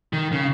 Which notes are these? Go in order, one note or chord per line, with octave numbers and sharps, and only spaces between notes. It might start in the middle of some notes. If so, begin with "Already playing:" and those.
D#3
C#3